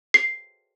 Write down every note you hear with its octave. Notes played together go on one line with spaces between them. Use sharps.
C7